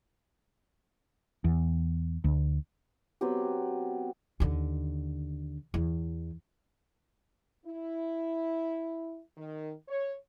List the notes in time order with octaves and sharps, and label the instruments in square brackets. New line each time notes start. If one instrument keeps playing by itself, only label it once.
[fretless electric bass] E2
D2
[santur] F#3 B3 C4 G4
[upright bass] D#2 D3
E2
[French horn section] E4
D#3
C#5